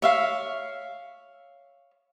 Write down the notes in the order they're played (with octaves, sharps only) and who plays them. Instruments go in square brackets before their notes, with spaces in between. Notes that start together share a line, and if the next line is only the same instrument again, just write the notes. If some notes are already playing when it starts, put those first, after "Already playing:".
[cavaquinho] C#5 E5 F5